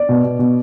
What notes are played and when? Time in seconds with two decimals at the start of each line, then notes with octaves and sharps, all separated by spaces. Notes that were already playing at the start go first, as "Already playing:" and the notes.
Already playing: D5
0.09 B2
0.24 B2
0.39 B2